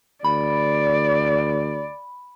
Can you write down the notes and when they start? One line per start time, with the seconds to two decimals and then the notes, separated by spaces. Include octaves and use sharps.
0.24 D2 D5 B5